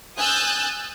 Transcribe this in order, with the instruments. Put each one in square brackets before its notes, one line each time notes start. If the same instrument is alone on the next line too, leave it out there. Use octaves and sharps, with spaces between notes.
[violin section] G#5 D#6 E6 F#6 G6 A6